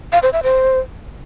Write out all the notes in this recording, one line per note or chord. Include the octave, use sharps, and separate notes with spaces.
F5
C5
E5
C5